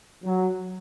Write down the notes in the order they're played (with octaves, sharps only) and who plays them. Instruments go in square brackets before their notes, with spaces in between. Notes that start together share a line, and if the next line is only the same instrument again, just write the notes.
[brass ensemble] F#3